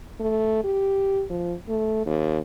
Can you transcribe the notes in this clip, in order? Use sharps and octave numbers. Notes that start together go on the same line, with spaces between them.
A3
G4
F3
A3
D#2